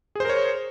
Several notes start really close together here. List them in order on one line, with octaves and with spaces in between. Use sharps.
G#4 C5 A#4 C#5